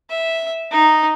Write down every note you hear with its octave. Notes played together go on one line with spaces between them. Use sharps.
E5
D#4